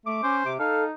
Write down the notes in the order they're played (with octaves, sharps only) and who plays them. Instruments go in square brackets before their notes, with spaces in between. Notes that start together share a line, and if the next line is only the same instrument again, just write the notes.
[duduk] A3 [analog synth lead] D6
[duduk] C#4 [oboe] C5
[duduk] C3 [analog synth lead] D6
[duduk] D#4 [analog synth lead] A4 [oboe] F5